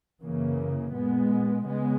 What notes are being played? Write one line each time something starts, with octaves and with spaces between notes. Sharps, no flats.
F#2 C#3 E3 A#3
A#2 G#3 B3
C#3 G#3 B3